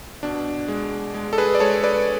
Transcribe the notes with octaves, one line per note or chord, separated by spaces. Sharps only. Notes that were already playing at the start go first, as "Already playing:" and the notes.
B2 D4
G#3
G#3
A4
G#4 B4
D5
G#3 A4 C#5
B4 D5